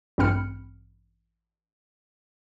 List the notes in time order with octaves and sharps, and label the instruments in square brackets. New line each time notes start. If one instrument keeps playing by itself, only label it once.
[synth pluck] A1 G2 C4 B5 F6 C#7